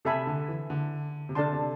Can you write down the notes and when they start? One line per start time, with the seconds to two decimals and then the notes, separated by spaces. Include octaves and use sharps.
0.05 C3 A4 E5 G#5 B5
0.27 D3
0.48 E3
0.70 D3
1.29 C3
1.35 D3 D4 A4 D5 A5 C6
1.52 C3